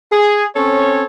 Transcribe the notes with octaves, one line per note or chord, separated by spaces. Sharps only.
G#4
C4 C#4 A4 C#5